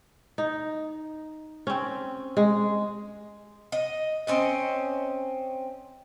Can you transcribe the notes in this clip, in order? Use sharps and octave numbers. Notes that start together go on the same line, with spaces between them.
D#4
C4 C#4
G#3
D#5
C4 C#4 D#5